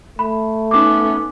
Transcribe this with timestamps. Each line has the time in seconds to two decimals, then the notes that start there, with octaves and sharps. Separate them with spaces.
0.19 A3 B5
0.71 B3 C#4 D#4 D6